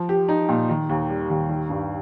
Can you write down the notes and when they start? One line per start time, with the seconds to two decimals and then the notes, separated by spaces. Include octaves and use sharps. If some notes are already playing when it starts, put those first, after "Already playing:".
Already playing: F3
0.09 G4
0.29 D#4
0.49 A#2
0.69 D#3
0.89 D#2
1.10 G3
1.30 D#2
1.49 D#3
1.70 G2